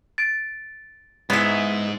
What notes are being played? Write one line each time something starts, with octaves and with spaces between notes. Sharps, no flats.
A6 D7
G#2 G#3 B3 E4 E5